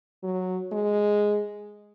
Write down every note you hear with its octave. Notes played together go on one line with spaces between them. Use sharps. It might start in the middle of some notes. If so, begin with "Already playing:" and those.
F#3
G#3